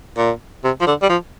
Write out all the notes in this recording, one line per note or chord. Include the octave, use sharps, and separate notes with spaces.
A#2
C3
F3
D3
G3
F3